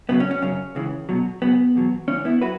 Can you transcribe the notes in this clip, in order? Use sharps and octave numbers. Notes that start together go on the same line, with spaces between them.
F#2 C#3 F#3 B3
C#4
C#4
F#2 C#3 F#3 C#4
C#2 C#3 E3
B1 B2 F#3
C#2 C#3 F#3 B3
E2 B2 F#3
C#2 C#3 E3 C#4
B3 E4
F#3 F#4 B4